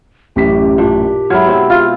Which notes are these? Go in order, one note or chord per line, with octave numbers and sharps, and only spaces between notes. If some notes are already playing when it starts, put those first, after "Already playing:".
A1 F#2 G4 B6
A#2 D4
F#3 G#3 E4 F6 G#6
B2 C4 E4
F4